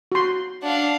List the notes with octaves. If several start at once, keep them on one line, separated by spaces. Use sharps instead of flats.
F#4 C6
D4 F5 F#5